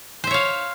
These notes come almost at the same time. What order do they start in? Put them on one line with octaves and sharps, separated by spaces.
C5 E5 C#5 F5